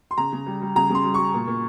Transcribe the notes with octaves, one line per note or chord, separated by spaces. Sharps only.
C6
C#3 A#5
C#3
G3
G3
C#3 A#5
C#3 C6
G3
G3 C#6
A#2
A#2